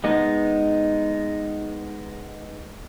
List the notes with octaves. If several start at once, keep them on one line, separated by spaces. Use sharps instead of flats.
G#3 B3 D#4